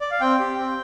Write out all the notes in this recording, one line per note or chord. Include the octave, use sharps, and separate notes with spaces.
D5
F5
C4 G5
G4
C4